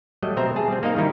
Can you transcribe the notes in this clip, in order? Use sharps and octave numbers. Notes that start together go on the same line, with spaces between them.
F#3 G3 A3 D#5
B2 C4 C5 E5 A#5
G#4 A5
G3 C4
A#3 D#4 D#5 F5
D#3 G3 D#4 E4